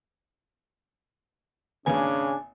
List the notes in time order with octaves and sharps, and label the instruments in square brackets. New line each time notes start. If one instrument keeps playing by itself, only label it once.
[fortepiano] G#1 A#3 B4 [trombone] C#3 [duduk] D4 [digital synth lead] G#5